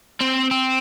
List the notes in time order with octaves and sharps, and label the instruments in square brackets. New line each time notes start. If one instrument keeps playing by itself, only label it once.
[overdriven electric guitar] C4
C4